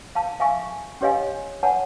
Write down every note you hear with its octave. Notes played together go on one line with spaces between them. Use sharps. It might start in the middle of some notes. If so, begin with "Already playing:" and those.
F5 A5
E5 F5 G#5 C#6
C#4 G4 C#5 D#5 F5 G#5
C#5 F#5 G#5 A5